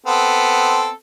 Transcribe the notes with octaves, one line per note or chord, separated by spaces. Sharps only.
B3 C4 A4